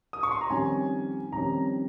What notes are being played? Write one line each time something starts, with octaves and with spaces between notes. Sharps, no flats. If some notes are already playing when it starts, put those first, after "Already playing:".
D#6
C#6
C6
A#5
F2 D#3 G3 C#4 G#5
F2 D#3 G3 C#4 A#5